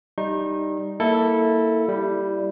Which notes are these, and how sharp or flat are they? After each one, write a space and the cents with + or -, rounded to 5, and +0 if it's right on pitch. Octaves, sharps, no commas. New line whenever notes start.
G3 +0 D#4 +0 C#6 -40
A#3 +0 E4 -15 A4 +10
G3 +0 E4 +10